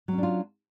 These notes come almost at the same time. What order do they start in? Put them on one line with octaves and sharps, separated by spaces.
F#3 C#4 D4 F4